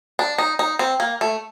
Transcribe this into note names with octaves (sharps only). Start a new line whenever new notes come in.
D4
D#4
D#4
C4
A#3
A3